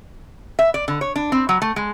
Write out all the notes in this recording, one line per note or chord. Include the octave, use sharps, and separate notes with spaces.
E5
D5
D3
C#5
D4
C4
F#3
A3
G#3